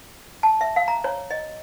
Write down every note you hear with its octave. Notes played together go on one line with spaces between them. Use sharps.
A5
E5
F5
A#5
C#5
D#5